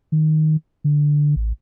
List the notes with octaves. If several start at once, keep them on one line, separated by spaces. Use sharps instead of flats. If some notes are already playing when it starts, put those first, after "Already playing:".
D#3
D3
A1